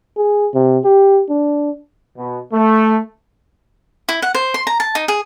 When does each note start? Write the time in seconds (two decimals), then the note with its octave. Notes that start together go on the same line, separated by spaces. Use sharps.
0.17 G#4
0.54 C3
0.85 G4
1.29 D4
2.16 B2
2.52 A3
4.09 E4
4.22 F#5
4.35 C5
4.54 C6
4.67 A#5
4.80 A5
4.95 D#4
5.08 G#4